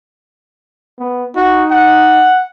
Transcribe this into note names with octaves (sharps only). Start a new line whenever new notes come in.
B3
D#4 F#4
F#5